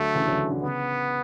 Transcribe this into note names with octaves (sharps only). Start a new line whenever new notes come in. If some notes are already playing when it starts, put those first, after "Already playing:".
Already playing: D3 F#3 A3
C#3 E3
D3 F#3
D3
C#3 B3